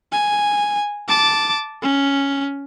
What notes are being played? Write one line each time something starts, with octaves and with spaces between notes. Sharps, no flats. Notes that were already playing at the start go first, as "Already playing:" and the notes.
G#5
A5 D6
C#4